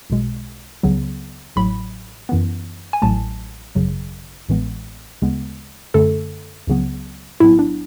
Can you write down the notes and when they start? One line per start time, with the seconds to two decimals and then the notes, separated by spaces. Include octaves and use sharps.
0.10 B1 B2 G#3
0.83 C#2 C#3 F#3 B3
1.56 A1 A2 F#3 B5
2.29 F#2 E3 B3
2.93 G#5
3.02 A1 A2 F#3 A3 A5
3.75 G#1 F#2 C#3 F#3
4.49 A1 A2 E3 G#3 B3
5.22 D2 C#3 G#3 B3
5.94 F#2 D3 A3 A4
6.67 C#2 C#3 F#3 B3
7.40 B1 A2 F#3 B3 E4
7.59 D4